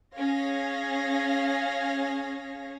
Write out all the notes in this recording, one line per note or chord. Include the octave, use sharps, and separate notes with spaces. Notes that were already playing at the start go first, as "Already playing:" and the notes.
C#4 G#4 C#5 F5 A#6